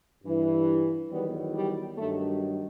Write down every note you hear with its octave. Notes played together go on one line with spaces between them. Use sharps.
G2 E3
E2 D#3 F#3 G3 B3
G3
G2 D#3 F#3 A3